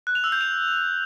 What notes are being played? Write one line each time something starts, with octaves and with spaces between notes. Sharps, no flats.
F#6
F7
E6
G6
F7